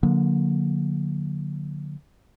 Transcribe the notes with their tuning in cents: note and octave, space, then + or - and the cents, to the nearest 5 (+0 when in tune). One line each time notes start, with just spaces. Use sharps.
D3 +0 F#3 -45 A#3 +5